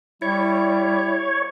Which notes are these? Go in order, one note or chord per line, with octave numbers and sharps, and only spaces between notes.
G3 E4 C#5